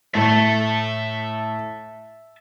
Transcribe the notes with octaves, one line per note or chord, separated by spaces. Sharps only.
A2 E5 A5